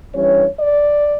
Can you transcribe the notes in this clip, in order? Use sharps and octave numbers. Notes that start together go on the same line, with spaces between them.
G2 E3 G3 C#4 C#5
D5